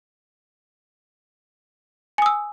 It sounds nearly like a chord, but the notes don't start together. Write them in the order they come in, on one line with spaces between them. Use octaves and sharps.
G#5 D#6 E6